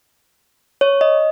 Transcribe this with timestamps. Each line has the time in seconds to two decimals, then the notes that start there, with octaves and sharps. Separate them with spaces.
0.81 C#5
1.01 D#5